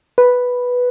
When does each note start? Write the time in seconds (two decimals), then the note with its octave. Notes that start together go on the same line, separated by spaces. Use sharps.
0.18 B4